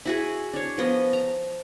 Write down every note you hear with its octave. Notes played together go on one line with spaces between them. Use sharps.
E4 F#4 G#4
D4 C#5
F3 B3 D#5
A#5